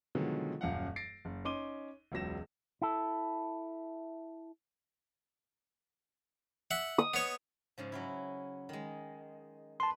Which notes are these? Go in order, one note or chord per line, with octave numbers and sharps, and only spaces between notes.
B2 D3 D#3 F3 F#3 G#3
D#1 F#2 F5 F#5
A6 A#6 C7 D7
F#1
C#4 D#4 C6 D6 D#7 G7
E1 C#2 F#3 A#6 E7
E4 A4
E5 F#5
D#6
B3 C#5
G#2 C#3 F3
F#3 C#4 E4
D#3 G#3
B4 A5 C6